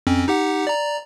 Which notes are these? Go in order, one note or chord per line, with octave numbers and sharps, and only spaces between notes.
F2 C4 C#4
D#4 G4 F#5
D5 A#5